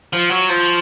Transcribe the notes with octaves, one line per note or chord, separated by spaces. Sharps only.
F3
F#3
F3